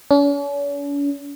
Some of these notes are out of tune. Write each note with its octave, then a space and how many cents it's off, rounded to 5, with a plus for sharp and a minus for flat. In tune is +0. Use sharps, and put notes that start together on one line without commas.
C#4 +45